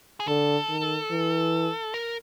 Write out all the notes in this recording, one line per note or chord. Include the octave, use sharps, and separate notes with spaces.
G#4
D3 A4
D#3
E3
A#4